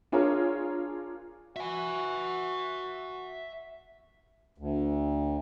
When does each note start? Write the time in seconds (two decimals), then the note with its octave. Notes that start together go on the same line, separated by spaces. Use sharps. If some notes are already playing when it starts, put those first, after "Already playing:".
0.12 D4 F4 G#4 A#4 C#5
1.56 F#4 E5 G#5
4.58 D2